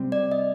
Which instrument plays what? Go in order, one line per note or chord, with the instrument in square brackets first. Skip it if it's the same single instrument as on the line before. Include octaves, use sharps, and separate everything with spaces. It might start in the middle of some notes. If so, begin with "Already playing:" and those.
Already playing: [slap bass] C3 G3 C4
[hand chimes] D5
D#5